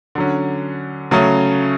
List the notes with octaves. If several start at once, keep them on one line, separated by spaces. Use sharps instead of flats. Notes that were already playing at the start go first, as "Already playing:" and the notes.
D3 F#3 C#4
C#3 F#3 A3 C#4